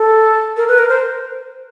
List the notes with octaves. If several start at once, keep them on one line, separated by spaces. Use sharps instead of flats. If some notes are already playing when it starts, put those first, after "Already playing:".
Already playing: A4
A#4
B4
A#4
C5